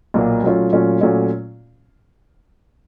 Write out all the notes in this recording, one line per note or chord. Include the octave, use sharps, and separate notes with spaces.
B1 A#2 F#3 A#3
A#2 F#3 A3 C#4 F4
A#2 F#3 A3 C#4 F4
A#2 F#3 A3 C#4 F4